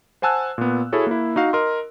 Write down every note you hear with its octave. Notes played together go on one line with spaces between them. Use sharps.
C5 F#5 G#5 A5 E6 F#6
A#2 B3
E4 F#4 G#4 A4 C#5
A#3 E4
D#4 F#4 F5
A#4 D#5 C6